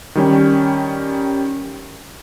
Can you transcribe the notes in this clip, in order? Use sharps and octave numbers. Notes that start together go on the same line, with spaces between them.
D#3 G3 C#4